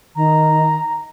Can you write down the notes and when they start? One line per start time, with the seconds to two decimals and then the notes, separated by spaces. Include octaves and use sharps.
0.16 D#3 A#5